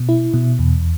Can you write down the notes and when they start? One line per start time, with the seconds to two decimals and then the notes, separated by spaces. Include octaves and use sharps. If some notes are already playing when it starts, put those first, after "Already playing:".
Already playing: B2
0.09 E4
0.34 B2
0.59 E2